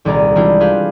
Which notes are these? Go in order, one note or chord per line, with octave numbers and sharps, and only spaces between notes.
D#1 C2 G#4 D5 A#5
E3 G#3 C4 D4 E4 F4
F4 G4 G#4 B4 F5